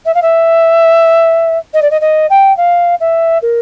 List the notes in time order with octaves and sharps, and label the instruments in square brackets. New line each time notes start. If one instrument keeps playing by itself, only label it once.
[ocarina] E5
F5
E5
D#5
D5
D#5
D#5
G5
F5
E5
A#4